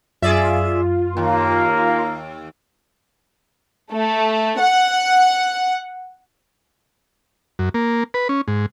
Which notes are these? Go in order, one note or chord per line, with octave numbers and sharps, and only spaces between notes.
F#2 F4 G#4 D5 E5
D#2 A#3
A3
F#5
F#2
A#3
B4
C#4
G#2